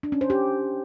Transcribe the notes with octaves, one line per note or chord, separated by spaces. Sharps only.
D4
C#4
C5
G4